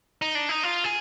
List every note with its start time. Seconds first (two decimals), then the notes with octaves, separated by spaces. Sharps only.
0.22 D#4
0.35 D4
0.49 D#4
0.63 F4
0.84 G#4